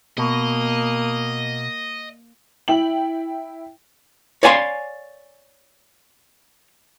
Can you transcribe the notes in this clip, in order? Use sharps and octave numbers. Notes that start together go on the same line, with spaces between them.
B2 A#3 D#5
E4 G5 F#7
C#5 D5 F5 G#5 A5 C6